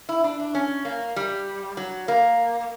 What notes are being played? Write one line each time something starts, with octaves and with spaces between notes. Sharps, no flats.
E4
D4
D4
C#4
A#3
G3
F#3
A#3